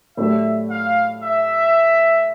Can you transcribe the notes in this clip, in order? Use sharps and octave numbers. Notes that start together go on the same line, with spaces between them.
A2 F#3 A3 D4 G4 E5
F5
E5